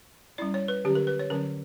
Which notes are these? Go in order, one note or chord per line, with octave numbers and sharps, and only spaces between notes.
G3 C#4 E4 D5
C#5
B4
D3 F#3 C#4 G4
A#4
B4
C#5
D3 F#3 C#4 A#4